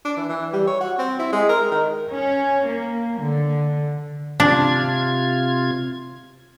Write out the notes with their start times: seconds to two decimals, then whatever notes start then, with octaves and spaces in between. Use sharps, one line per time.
0.05 D4
0.17 E3
0.29 E3
0.53 G3
0.67 C#5
0.81 F#4
0.99 C4
1.19 E4
1.33 G#3
1.49 A#4
1.72 D#3
2.09 C#4
2.66 A#3
3.21 D3
4.40 C3 D4 F4 G#6